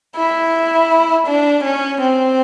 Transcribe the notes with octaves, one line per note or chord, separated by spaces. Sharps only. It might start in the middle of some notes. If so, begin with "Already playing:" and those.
E4
D4
C#4
C4